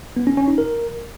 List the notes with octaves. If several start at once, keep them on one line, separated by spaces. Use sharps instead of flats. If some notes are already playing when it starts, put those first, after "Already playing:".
B3
C#4
C#4
D#4
A#4